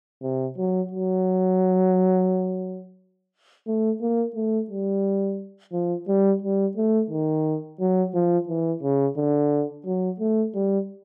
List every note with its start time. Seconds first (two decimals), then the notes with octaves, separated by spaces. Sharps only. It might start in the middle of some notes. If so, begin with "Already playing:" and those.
0.23 C3
0.58 F#3
0.91 F#3
3.67 A3
4.01 A#3
4.36 A3
4.71 G3
5.73 F3
6.08 G3
6.42 G3
6.77 A3
7.10 D#3
7.80 F#3
8.14 F3
8.48 E3
8.83 C#3
9.17 D3
9.86 F#3
10.20 A3
10.55 G3